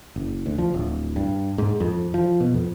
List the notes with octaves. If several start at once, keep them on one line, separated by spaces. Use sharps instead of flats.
F#1
D2
F3
D1
G2
G#2
F2
F3
B2
F2